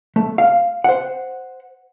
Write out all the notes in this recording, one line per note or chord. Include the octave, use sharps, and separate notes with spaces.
A3
F5
C5 F#5